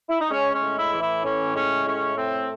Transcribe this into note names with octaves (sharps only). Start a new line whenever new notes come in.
E4
D#4
G#3 C#4
C#4
A2
E4
E3
E4
A2 C#4
G#3 C#4
A2 C#4
A3 C4